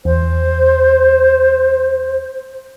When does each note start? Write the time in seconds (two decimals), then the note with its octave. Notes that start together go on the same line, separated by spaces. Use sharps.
0.05 E2 C5